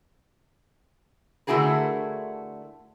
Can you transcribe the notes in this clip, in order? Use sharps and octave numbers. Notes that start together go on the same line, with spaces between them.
D3 A3 E4 F#4 G#4 A#4